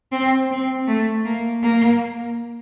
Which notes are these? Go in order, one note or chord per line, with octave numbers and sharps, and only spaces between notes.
C4
C4
A3
A#3
A#3